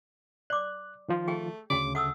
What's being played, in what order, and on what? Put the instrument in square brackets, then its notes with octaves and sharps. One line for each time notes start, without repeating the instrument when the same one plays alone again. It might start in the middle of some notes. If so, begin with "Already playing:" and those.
[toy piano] D5 D6 [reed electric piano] F#6
[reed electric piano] D#3 F3 F4
[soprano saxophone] A3 [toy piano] G#4 G5
[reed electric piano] D2 C#3 [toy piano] F#4 G5 [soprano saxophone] D6
[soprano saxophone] A3 [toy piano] F#5 D#6 E6